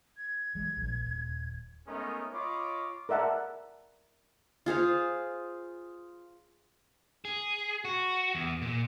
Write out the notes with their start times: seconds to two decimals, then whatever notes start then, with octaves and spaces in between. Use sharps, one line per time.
0.17 G#6
0.55 E3 G3 G#3
0.77 A#1
1.06 D#1
1.87 G#3 A3 B3 C#4 D#4 A#4
2.33 F4 C#5 D#5 B5 D6
3.09 A#4 D5 E5 F#5 A5
4.66 F4 G#4 C5 F5
7.25 G#4
7.85 F#4
8.35 E2
8.62 A#2